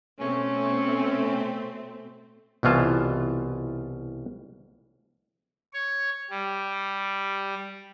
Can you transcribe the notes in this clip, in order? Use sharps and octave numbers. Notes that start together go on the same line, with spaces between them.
B2 A3 C4 C#4
C2 B2 E3 F4 A5
C#5
G3